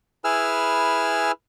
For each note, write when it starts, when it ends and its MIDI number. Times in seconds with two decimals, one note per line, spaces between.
0.24 1.32 64
0.24 1.32 68
0.24 1.32 71
0.24 1.32 80
0.24 1.32 88
0.24 1.32 89